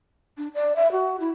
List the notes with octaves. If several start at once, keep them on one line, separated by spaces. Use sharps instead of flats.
D4
D5
E5
F#4
E4